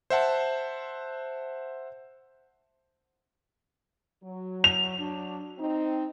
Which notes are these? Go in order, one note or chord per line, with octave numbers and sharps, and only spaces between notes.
C5 E5 F#5 A5
F#3
F7
F#3 D4
C4 D#4